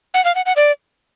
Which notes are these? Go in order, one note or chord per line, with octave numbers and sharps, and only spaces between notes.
F#5
F5
F#5
F#5
D5